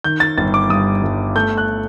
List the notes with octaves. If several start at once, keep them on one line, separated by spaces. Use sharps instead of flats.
D#3 G6
A6
G1 A6
D6
G2 D#6
G1
A3 G6
F#6